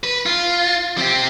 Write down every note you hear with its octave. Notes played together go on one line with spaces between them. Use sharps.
B4
F4
C4 G4